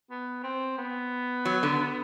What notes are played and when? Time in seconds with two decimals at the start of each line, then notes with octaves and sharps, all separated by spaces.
0.10 B3
0.44 C4
0.78 B3
1.45 F#3
1.63 D3